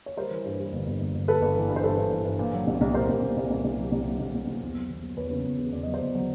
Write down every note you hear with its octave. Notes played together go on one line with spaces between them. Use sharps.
C#5
G3 A#4 C5
E3
G2
G3
G1
G1
G1
G1
G3 A4 B4
G1
E3
G2
C5
G2 A4 B4
G2
E3
G2
A#2
F#3
C2
C2
C2 A#4 C5
C2
C2
C2
C2
C2
F#3
C2
F#3
C2
C2
C2
E2
F#3
E2
F#3
E2 B4 C#5
C#3
E2
C#3
E2 D5
F#3 D#5
C5 D5
E2
F#3